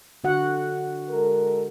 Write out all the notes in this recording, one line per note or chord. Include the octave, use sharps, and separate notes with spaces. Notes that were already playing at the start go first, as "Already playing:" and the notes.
D3 F#4 F#5
G#3 A4 A#4